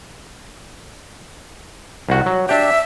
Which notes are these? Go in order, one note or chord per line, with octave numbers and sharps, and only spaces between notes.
C2 F#4
F#3
D4 G4 E5